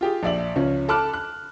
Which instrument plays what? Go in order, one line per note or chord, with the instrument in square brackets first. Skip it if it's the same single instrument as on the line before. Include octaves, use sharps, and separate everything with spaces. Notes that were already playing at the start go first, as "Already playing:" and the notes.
[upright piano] F4 G4 G#4
A#1 D5 E5 F#7
C#2 F3 C#4
A4 A5 B5 D6 F6 F#6
F#6